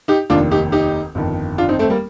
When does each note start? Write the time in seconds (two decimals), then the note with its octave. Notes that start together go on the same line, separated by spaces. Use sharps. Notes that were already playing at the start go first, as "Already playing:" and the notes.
0.08 D#4 G4
0.30 F1 D#2 D#3 D4 F4
0.51 D#4 G4
0.72 D#4 G4
1.15 G1 F2 D#3
1.58 D4 F4
1.69 C4 D#4
1.79 A3 C4
1.90 G3 A#3